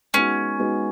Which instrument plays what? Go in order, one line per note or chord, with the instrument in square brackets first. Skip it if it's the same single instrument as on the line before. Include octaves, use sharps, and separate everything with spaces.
[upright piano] G#3 B3 D#4 F#4 [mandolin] C#4
[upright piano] G#3 B3 D#4 F#4